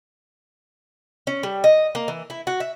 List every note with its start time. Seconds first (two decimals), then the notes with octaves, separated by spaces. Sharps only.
1.27 C#4
1.43 G3
1.64 D#5
1.95 A#3
2.08 E3
2.30 E4
2.47 F#4
2.60 E5